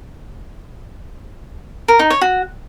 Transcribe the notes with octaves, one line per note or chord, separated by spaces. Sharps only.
A#4
D#4
C#5
F#4